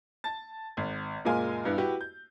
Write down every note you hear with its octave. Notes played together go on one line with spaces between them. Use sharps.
A5 A6
G#1
F#1 A#2 G#3 F4 A#4 G#5
G2 G3 B3 E4
E4 F#4 G4 B4
G6